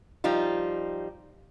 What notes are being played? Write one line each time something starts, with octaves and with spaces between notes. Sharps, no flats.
F3 G3 D#4 F4